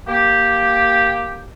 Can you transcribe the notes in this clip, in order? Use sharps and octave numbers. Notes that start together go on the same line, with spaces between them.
A#3 G4